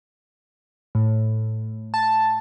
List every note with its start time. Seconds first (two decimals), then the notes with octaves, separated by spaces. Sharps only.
0.95 A2
1.94 A5